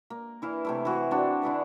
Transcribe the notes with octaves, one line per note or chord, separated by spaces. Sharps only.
A#3
E3 E4 F5
C3 A3 E4
E3 F#4 G#4
C4 D4 F#4
D3 E4 G#4 B4